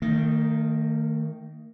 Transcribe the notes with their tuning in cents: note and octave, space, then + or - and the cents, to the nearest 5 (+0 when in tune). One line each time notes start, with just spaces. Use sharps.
D#3 +0 A3 +45